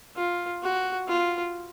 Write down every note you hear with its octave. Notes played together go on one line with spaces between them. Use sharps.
F4
F#4
F4